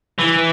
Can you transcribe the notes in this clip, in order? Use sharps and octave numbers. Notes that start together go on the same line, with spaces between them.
E3